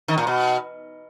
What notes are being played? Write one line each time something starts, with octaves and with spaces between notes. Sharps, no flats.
D#3
A#2
B2